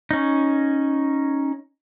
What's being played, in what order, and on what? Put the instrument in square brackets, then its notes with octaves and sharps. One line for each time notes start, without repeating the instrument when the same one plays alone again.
[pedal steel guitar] C#4 D#4